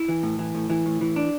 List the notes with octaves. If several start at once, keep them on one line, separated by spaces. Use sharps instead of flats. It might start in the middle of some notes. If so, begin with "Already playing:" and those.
Already playing: E4
E3
A2
E3
A2
E3
A2
E3
D4